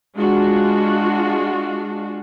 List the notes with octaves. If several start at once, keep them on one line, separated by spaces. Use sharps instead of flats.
G#3 D4 F4 F#4